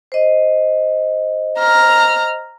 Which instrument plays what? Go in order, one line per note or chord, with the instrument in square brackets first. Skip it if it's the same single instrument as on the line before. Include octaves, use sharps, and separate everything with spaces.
[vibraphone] C5 D#5
[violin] A#5 F6